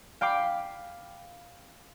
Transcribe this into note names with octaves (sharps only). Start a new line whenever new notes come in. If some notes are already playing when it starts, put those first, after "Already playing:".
F5 G5 B5 D6 C7